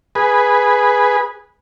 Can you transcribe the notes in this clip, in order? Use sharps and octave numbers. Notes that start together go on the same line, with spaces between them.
G#4 B4